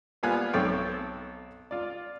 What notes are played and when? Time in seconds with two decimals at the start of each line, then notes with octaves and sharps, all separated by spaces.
0.23 G3 A#3 B3 F4 G#5 F#6
0.54 B1 C4 A4 C#5 G5 C#6
1.71 F4 D5